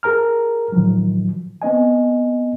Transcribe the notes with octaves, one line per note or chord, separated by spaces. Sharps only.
G#4 A#4 A#5 F6
A2 D#3 F3 F#3
B3 C4 D#5 G#5